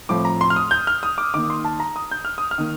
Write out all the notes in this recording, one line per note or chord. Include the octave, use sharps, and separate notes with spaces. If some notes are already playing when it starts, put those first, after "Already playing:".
A2 F3 A3 C4 D6
A#5
C6
F6
D#6
G6
F6
D#6
D6
D#3 A#3 D6
C6
A5
A#5
D#6
G6
F6
D#6
F6
D#3 A#3